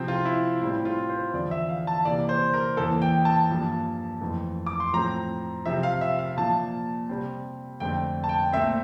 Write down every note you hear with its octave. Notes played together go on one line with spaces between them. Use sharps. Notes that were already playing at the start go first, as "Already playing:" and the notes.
Already playing: C3 F3 C4
F4
E4
A2 G3 C4 E4
F4
C5
E2 D3 F3 C4 D5
E5
F5
A5
C3 E3 A#3 D5
C5
A#4
E2 E3 A#3 A4
G5
A5
G2 F3 A#3
F2 E3 A3 C4
D6
C6
A2 F3 A3 C4 A#5
C3 F3 C4 E5
F5
E5
F5
A#2 F3 A#3 A5
C3 G3 C4
F2 D3 A3 C4 G5
A5
G5
A#2 A3 C4 E5